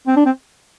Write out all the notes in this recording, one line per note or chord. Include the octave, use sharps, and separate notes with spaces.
C4
D4
C4